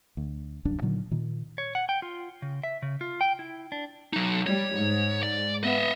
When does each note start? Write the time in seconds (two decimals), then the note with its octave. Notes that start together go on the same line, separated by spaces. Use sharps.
0.17 D2
0.65 D1 C2 F#2 D4
0.82 A#2 D3 D#3 F#3
1.11 A#2 D#3
1.58 C#5
1.75 F#5
1.89 G5
2.02 F4
2.42 C#3
2.64 E5
2.82 C#3
3.01 F4
3.21 G5
3.39 E4
3.72 D4
4.13 F#3 D#4
4.47 G3 C#5
4.77 G#2
5.23 D5
5.64 B3 D#5 E5